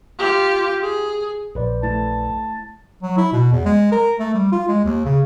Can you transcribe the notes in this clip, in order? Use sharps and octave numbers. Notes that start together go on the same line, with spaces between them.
F4 G4
G#4
A#1 B4 C5 D5
A3 E4 A5
F#3
E4
B2
E2
G#3
A#4
A3
G3
F4
G#3
D#2
C#3